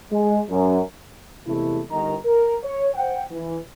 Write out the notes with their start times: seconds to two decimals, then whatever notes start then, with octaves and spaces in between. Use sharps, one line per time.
0.12 G#3
0.49 F#2
1.47 E2 C3 G#3 A3 E4
1.91 G1 D#3 D#5 A#5
2.25 A#4
2.64 C#5
2.95 C5 F#5 G5
3.31 E3